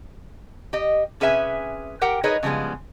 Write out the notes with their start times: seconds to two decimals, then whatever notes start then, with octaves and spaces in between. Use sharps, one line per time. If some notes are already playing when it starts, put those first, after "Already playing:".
0.73 G4 D#5
1.20 C3 C#4 G#4 B4 E5 G#5
2.01 G4 A#4 F#5 G5
2.23 D#4 G#4 A#4 B4 C#5 D#5
2.43 C#3 F3 G3 G#3 B3